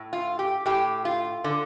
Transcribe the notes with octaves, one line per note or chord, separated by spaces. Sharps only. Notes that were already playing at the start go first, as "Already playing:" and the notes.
Already playing: A2
F4
G4
A2 G4
F4
D3